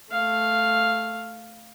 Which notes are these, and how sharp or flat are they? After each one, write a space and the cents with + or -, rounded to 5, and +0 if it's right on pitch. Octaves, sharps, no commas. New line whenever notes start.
A3 +0 F5 +0